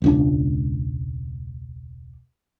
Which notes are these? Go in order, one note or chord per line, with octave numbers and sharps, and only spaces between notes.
E1 C#2 D4